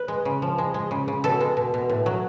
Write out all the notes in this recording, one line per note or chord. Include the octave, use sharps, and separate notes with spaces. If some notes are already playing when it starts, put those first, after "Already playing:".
Already playing: B4
G#3
C#3
F3
G#3
G#3
C#3
C#3
B2 A4
G#3
B2
B2
A2
F#3